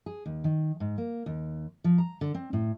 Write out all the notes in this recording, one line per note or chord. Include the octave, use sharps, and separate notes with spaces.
G#4
D#2
D#3
G#2
A#3
D#2
F3
A#5
D3
C4
A2